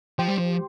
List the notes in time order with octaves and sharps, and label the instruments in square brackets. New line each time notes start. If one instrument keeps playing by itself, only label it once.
[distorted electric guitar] F3 [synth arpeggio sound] G4 C5
[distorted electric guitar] G3
F3